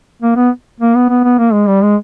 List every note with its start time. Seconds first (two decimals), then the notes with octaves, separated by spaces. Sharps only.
0.22 A#3
0.36 B3
0.80 A#3
0.95 B3
1.09 B3
1.24 B3
1.38 A#3
1.53 G#3
1.68 G3
1.83 G#3